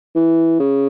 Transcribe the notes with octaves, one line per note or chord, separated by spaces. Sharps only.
E3
C#3